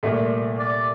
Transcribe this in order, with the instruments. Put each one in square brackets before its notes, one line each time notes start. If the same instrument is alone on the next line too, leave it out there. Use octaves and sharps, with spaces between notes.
[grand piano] C2 A#2 A3
[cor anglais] D5